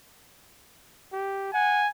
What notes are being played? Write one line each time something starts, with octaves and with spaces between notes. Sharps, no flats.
G4
F#5 G#5